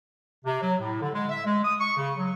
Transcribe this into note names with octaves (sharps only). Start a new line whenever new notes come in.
C3
F#3
A2
D3
G#3
E5
G#3
D#6
C#6
C#3
F#3